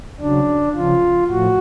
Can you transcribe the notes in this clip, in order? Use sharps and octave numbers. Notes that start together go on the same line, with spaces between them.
C#3 F#3 D4
C#3 F3 F4
A2 F3 F#4